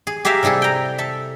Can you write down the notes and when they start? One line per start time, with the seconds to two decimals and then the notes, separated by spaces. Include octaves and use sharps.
0.07 G#4
0.25 G4 G#4 A#4 E5 F5
0.43 C3 G3 E4 G#4 A4
0.62 G5 A#5
0.98 A4 E5